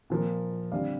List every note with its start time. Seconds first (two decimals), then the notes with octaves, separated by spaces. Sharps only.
0.10 A#2 F3 A#3
0.72 D3 G3 C4 D5 F5